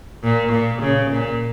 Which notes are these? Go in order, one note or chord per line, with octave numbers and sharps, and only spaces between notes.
A#2
A#2
C#3
A#2